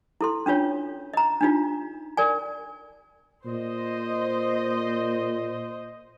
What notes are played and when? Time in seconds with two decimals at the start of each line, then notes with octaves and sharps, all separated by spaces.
0.21 E4 A4 C6
0.46 C#4 D4 F4 C#5
1.14 D#5 A#5
1.41 D4 D#4 F4
2.17 A#4 D5 G#5
3.46 A#2 C5 D#5